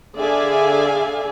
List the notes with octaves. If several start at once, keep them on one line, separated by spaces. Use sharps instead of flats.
D3 G#4 D5 E5 F5 G#5